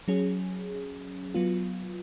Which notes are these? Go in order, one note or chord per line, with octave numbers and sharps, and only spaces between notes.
F#3 C#4 G#4
F#3 B3 F4